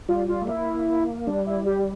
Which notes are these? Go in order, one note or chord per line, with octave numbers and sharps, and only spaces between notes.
G3 F4
F4
A3
A#3 E4
G3 D4
E4
G4